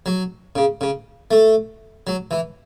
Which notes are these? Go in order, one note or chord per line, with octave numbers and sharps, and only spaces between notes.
F#3
C#3
C#3
A3
F#3
E3